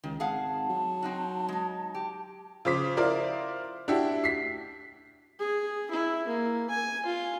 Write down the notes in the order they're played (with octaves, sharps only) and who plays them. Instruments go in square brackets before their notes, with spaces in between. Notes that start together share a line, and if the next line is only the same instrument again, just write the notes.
[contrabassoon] C#2 [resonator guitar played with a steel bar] D#3
[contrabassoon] G#1 [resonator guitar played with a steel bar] G#4 F5 F#5 [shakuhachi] A5
[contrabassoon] F#3
[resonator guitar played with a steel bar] C4 D#4 F#4
G#3 D#4
G4
[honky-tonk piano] C#3 F3 C5 D6 B6
E4 F4 A#4 C5 D5 F5
D4 E4 F#4 G4 E5
B6 C7
[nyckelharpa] G#4
E4
A#3
G#5
F4